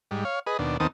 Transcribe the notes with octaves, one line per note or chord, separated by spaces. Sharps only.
G#2 G3
C#5 F5
G#4 B4 D#5
D#2 B2 D4
D#2 D#3 B3 C4 A5 D#6